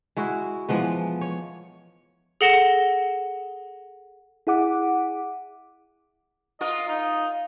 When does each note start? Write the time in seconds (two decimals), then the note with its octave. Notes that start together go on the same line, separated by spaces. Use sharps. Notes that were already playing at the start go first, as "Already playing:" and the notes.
0.17 G#3 E4 F#4
0.69 E3 F3 G#3 B3
1.21 C#5
2.41 G#4 A4 F#5 A#6 E7 G7
4.47 E4 G#4 F#5 D6
6.61 F4 A#4 D#5
6.88 D#4